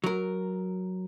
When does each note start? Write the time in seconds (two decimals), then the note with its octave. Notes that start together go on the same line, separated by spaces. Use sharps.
0.04 F#3 A#4